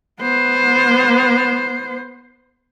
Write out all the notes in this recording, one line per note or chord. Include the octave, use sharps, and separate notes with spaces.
B3 C5